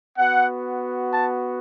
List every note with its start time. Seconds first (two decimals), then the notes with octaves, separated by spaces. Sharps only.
0.16 B3 F#4 F#5
1.12 A5